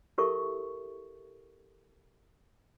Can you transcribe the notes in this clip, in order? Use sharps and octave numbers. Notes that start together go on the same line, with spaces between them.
E4 G4 A4 A#4 E5 C#6